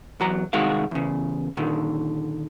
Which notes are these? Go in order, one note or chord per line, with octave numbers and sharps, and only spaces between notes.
E2 F#3 A#5
C2 D#3 G#3 F#4 F5
E2 C#3
A#2 D3 D#3